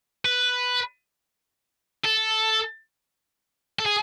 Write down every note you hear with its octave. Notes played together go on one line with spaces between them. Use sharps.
B4
A4
A4
G#4